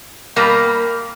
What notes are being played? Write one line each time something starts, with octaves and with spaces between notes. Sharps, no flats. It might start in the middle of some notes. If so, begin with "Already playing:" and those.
B2 G3 A#3